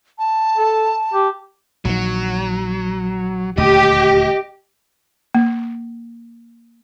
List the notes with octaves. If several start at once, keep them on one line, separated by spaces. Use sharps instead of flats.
A5
A4
G4
A#1 D#3 F#3
D#1 D2 G4 D#5
A#3